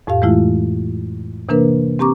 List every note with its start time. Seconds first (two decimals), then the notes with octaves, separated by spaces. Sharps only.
0.07 F2 A2 G4 F5
0.22 E3 G#3 A3 E4 F4
1.49 C3 E3 A#3 D4 A#4 B4
1.99 C4 G4 A#5 C#6 D6